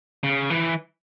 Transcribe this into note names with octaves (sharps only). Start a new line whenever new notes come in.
C#3
E3